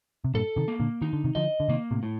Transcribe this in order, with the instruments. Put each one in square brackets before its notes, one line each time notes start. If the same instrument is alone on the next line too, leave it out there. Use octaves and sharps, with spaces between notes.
[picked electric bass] C3
[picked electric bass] G2 A#2 [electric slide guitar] A4
[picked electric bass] C3 D#3
[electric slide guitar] A#3
[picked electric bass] A#2 D3
[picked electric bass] D#3 [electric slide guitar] D#4
[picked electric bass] D3
C3 D#3
[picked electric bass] D3 F3 [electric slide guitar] D#5
[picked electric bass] D3
[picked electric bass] C3 D#3 [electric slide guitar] A#3
[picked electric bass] A2 C3
[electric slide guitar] A2